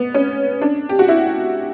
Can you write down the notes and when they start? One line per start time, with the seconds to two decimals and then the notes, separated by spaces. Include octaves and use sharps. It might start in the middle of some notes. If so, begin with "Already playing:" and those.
Already playing: B3
0.14 C#4
0.61 D4
0.89 G4
0.99 F#4
1.08 E4